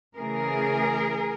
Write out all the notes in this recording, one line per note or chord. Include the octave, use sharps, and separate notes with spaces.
C#3 E3 A3 G#4 A#4